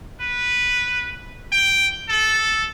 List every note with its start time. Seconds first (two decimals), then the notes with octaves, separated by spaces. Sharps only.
0.21 B4
1.52 G5
2.09 A4